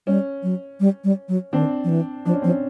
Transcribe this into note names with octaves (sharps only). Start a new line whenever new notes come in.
G3 C#4
F#3
G3
G3
F#3
D#3 C4 D4
F3
E3
F3 D4
C#4
F3 C4
C#4